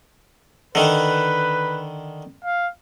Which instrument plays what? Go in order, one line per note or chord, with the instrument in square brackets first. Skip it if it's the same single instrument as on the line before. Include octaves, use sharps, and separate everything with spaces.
[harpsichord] D3 D#3 [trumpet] B4
[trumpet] F5